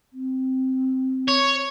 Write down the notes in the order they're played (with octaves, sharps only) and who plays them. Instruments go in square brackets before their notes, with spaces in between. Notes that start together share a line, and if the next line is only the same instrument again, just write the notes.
[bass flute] C4
[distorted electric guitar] C#5